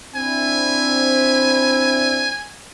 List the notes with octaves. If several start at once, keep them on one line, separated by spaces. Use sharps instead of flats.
C4 D4 E4 G#5